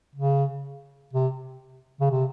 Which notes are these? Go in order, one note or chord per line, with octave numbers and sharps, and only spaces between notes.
C#3
C3
C#3
C3